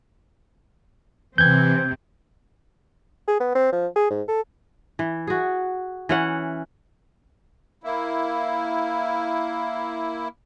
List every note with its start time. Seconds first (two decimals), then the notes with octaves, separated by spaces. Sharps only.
1.38 C3 E3 C4 G6 G#6
3.28 G#4
3.40 B3
3.55 C4
3.72 F3
3.96 G#4
4.10 G#2
4.28 A4
4.99 E3
5.27 F#4 G#4
6.09 E3 C#4 F#5
7.84 A#3 E4